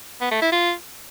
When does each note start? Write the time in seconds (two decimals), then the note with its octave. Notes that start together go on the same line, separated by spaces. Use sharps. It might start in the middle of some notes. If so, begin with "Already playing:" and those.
0.21 B3
0.31 A3
0.42 E4
0.52 F4